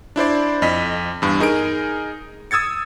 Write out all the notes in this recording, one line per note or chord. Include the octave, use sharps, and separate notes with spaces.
D4 E4 C5 D5
F2 D#5 B6
E2 G2
D#4 G#4 A#4 D7
D#6 E6 G#6 A6 C#7